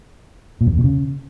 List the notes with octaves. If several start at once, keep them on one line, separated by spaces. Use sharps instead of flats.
A#2
F#2
E2
B2
C#3